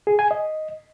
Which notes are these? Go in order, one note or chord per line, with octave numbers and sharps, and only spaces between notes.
G#4
G#5
D#5